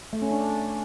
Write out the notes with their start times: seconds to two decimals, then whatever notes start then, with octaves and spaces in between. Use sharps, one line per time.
0.13 A3
0.22 C#4
0.31 D4